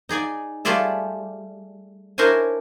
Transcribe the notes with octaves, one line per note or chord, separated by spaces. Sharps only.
D#4 G#4 D5 G#5
G3 A3 F4 G#4 D5 E5
D4 E4 A#4 C5 C#5 G#5